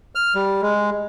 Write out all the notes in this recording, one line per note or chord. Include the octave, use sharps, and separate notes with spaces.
F6
G3
G#3